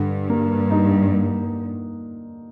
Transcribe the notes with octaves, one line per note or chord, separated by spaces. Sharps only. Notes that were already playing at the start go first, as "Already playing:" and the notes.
Already playing: G2 D3
A#3
D#4
A#3